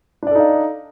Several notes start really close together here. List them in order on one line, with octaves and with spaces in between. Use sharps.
D4 D5 A4 D#4 F5